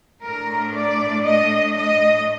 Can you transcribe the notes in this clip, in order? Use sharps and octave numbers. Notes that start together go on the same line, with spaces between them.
A2 A3 D4 A#4
D5
D#5
D#5